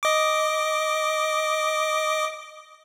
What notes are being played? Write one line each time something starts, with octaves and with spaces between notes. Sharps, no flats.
D#5 D6